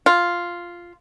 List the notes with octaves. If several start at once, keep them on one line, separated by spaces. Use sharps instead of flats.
F4